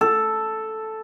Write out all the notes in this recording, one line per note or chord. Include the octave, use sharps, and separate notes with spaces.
A4